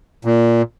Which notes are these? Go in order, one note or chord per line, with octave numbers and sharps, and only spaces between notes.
A#2